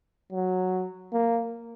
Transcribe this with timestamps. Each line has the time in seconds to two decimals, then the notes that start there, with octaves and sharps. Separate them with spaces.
0.32 F#3
1.13 A#3